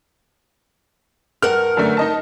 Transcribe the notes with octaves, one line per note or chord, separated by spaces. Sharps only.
G2 A#4 F#5 F6
F#2 D3 A3
D#4 D#5 A5